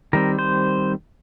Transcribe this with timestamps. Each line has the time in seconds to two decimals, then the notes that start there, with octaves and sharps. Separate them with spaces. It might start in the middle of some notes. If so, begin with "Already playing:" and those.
0.13 D#3 G3 C4 A#4
0.39 C5